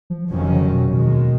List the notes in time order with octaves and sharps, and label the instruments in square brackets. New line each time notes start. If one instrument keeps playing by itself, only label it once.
[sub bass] F3
[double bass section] F1 F2 D#3 F#3 C#4 [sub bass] F3
[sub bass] C#3
B2
[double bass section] D#2 D#3 G#3 [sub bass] B2